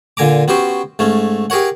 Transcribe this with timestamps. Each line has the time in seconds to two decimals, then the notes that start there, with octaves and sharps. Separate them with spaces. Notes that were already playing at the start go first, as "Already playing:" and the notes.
0.17 A#2 D3 G#5 A#5 D6
0.48 B3 C#4 F#4 G4 C5
0.99 G#2 A3 C#4
1.50 G4 G#4 A#4 C#5 F#5